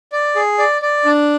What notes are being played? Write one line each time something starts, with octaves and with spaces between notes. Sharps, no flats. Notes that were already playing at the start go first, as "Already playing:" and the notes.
D5
G#4
D5
D5
D4